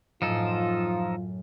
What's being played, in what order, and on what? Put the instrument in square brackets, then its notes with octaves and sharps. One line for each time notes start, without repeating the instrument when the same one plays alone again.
[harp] F#2 A2 [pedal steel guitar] F3 D#4 A4 [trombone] F4